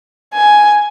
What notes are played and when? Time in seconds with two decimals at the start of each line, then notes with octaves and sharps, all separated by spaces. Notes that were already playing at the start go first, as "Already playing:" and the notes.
0.34 G#5